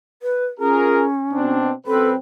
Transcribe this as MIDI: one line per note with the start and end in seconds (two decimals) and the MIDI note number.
0.22 0.46 71
0.59 1.56 61
0.59 1.05 65
0.59 1.05 68
0.59 1.05 70
1.33 1.72 47
1.33 1.72 60
1.33 1.72 62
1.87 2.15 42
1.87 2.15 60
1.87 2.08 69
1.87 2.15 71